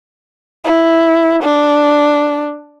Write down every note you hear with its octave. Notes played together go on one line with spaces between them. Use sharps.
E4
D4